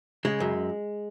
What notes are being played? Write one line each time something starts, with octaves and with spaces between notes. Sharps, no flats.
C#3 G#3
F#2